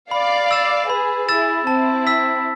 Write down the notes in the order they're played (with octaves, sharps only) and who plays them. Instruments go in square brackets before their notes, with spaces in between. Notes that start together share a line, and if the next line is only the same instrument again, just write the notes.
[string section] D5 F5 [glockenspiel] B5
[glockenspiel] E6 A6 E7
[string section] G#4 B4 [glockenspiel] B5
[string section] E4 G#4 [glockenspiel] E6 A6 E7
[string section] C4 E4 [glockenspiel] A5
[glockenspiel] E6 B6